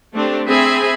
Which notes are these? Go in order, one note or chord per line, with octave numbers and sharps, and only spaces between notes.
A3 C4 D4 G4
C4 G#4 E5 G#5 B5